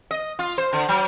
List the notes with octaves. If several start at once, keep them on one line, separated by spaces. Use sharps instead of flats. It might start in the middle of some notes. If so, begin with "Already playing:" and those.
D#5
F4
C5
D3
F#3